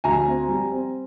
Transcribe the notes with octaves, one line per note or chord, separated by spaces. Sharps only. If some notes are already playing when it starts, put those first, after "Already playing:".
D2 G#5 A#5
C4
G3
C4